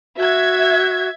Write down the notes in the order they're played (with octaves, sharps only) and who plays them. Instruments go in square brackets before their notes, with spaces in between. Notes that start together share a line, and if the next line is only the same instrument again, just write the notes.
[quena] F#4 [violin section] E5 G#6